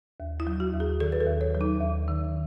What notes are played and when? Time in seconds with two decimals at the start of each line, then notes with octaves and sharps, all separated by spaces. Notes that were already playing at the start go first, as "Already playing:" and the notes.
0.20 D#2
0.40 E4
0.47 F#3
0.60 F#4
0.73 D#2
0.80 G#4
1.00 D#3 A4
1.12 B4
1.21 A4
1.27 D#2
1.41 C#5
1.55 F#3
1.61 D#4
1.81 D#2
2.08 D#3